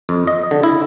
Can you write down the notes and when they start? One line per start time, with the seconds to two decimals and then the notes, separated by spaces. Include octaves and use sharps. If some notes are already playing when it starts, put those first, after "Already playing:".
0.09 F2
0.27 D#5
0.51 D3
0.63 E4